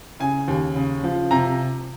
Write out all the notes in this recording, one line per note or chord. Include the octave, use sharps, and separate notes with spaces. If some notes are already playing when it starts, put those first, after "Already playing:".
C#3 G#5
D#2
C#3
F3
C3 A#5